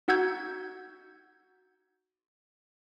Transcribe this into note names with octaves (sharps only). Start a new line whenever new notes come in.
D#4 F#4 F#5 E6 G6 G#6